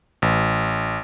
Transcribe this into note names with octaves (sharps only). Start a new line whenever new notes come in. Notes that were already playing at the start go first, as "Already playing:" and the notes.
A1